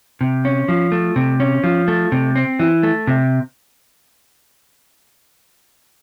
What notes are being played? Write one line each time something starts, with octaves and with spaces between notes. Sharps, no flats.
C3
C#4
F3
A3
C3
C#4
F3
A3
C3
C4
E3
A3
C3